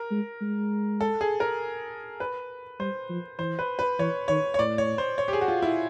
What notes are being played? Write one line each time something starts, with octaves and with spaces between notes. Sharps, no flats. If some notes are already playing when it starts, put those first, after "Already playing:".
Already playing: A#4
G#3
G#3
A4
G#4
A#4
B4
G3 C5
F3
E3 C5
B4
B4
E3 C#5
D#3 C#5
C#5
A2 D5
C#5
C5
C#5
G4
G#4
F#4
F4
E4